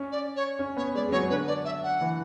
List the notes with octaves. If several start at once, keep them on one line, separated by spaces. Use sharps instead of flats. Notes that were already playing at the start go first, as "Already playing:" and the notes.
Already playing: C#4
D5
C#5
C#4
B3 C#5
G#3 D5
G#3
F#3 C#5
D3 B4
D5
E5
F#5
E3